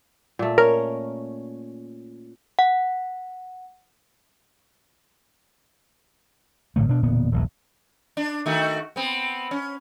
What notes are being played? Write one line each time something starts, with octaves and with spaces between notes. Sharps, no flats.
A#2 A3
C#4 A#4
F#5
G#1 A2 D3 A3
B2 D4
E1 A#2 D3 B3
D#1 A#1 G2
D4
D#3 A3 F#4
B3 C4
C#4